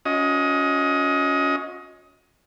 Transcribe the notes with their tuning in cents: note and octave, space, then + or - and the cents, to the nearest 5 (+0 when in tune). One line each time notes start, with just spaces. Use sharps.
C#4 +15 F#4 -45 D#5 +20